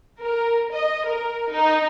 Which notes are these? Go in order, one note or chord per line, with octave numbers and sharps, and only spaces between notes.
A#4
D#5
A#4
D#4